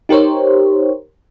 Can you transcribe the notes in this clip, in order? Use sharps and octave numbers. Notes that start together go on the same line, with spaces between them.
D#4 G4 A#4 C5 C#5